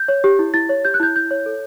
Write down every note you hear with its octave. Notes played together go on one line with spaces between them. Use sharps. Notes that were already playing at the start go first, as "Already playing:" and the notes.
Already playing: G6
C#5
G4
E4
E4 A6
C#5
G4 G6
F#6
E4 G6
E4 G6
C#5
A4